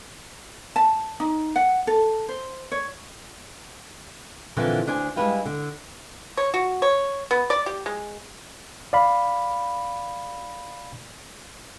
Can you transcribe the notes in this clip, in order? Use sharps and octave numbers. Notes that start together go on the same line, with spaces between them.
A5
D#4
F#5
A4
C5
C#5
F#2 A#2 D3 E3 F3 C4
D2 D4 C5 G#5
G3 G#3 E4 B4 F5 G5
D3
C#5
F#4
C#5
B3
D5
G4
G#3
D5 F5 B5